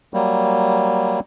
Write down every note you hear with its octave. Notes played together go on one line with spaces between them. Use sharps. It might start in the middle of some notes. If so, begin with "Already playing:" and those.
F#3 G3 A#3